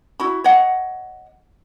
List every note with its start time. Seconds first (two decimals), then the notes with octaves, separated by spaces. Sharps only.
0.20 E4 F#4 B5
0.44 C#5 D#5 F#5